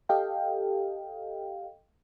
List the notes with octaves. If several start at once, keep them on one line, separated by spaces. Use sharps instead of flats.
G4 A4 D#5 F5 G5